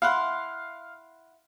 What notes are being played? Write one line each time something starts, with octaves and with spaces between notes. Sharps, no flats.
E4 F5 F#5 C6